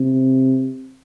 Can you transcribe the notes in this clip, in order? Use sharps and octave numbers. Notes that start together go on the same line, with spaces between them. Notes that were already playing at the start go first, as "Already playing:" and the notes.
Already playing: C3